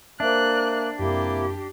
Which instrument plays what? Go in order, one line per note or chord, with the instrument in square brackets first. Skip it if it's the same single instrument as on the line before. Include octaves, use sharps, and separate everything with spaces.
[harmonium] A#3 [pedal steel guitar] D4 [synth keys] C5 E5 [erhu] F#6
[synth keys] F#2 [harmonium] C3 A#3 E4 [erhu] G4